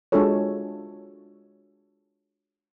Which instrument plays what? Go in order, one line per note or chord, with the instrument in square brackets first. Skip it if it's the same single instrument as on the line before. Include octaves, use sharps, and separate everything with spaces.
[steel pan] G#3 D4 F4 F#4 A4 C#5